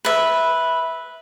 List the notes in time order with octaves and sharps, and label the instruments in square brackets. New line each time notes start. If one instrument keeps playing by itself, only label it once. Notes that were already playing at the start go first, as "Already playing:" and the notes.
[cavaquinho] B4 E5